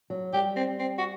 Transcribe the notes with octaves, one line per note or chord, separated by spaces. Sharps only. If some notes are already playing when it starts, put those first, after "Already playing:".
F#3
G3 G4
C4
C4
F#4